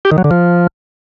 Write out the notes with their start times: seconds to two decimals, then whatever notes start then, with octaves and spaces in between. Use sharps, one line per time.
0.05 G4
0.11 D#3
0.18 F#3
0.24 D3
0.31 F3